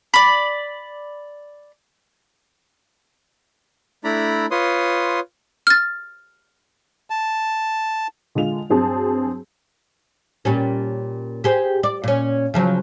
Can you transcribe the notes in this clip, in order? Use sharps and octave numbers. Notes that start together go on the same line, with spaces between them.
D5 B5
A3 D4 E4 D5 A#5 B5
F4 B4 C#5 C6 D#6
F6 A6
A5
D3 G#3 F4 F7
G2 F#3 C4 G#4 A5
A#2 G3 C#4
G4 G#4 C5
D5
A#2 C#4
C#3 F3 F#3